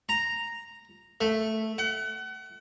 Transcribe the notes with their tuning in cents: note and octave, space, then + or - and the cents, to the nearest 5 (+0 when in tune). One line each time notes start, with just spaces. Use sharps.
A#5 -5
A3 +0
F#5 +35